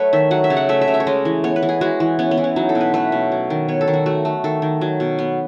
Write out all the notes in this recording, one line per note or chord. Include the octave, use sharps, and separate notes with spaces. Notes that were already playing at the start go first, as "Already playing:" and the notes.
Already playing: F#3 A3 B4 C#5
D#3 E5
F#3 F#5
E5
C#3
F#5
A3 E5
E5
C#3
E5
C#5
G#3 D#5
E3
B3 C#5
B4
E3
G#4
G#3 F#4
E3
B3 C#4
B3
E3
C#4
F#3 D#4
A4
B2
B4
A3 B4
B2
F#3
D#3
B3 C#5
A4
D#3
F#4
A3 F#4
A3
D#3 A4
D#3
F#3
B2
B3